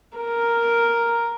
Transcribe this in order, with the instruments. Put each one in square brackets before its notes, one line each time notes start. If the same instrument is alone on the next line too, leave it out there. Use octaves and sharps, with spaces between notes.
[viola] A#4